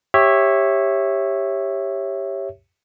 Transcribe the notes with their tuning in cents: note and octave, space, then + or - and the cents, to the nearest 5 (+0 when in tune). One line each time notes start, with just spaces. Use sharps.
G4 +5 C#5 -15 E5 +0